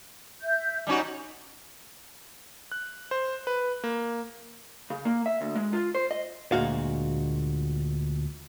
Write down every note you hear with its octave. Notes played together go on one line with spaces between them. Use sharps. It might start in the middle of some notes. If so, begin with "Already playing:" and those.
E5 G6
G3 C#4 D#4 F#4
F#6
C5
B4
A#3
C#3
A#3
E5
D2
G#3
F4
C5
D#5
D2 A#2 G#3 F#4 F5